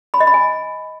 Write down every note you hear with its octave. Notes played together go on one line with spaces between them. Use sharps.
B5
D#5
B5
G#5